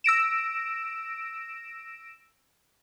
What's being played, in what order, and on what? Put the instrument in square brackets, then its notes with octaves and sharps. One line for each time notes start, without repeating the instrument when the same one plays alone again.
[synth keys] E6 A#6 D7 E7